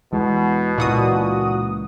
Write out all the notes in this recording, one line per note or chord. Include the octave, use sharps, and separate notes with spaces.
E2 B2 E3 G#3
C#2 A#2 E3 F#4 D#6